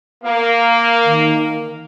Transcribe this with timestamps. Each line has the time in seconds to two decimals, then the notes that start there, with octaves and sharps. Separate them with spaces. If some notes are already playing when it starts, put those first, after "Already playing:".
0.24 A#3 F5
1.05 D#3